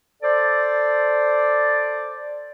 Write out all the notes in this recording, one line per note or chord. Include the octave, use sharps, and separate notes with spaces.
A4 C5 D5